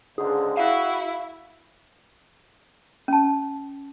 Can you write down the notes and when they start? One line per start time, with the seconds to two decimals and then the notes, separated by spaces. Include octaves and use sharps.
0.18 C#2 G#2 D3 G#4
0.57 E4 F#4 F5
3.08 C#4 A5